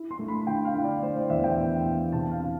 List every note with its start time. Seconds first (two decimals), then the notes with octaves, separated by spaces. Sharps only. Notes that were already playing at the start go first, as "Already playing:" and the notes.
Already playing: E4
0.11 C6
0.19 A3
0.28 B5
0.47 D3 G5
0.65 F5
0.75 E4
0.84 D5
1.03 A3 C5
1.16 D5
1.30 E2 E5
1.44 G5
1.58 E2
1.86 E2
2.13 C3 A5
2.31 F5
2.41 E4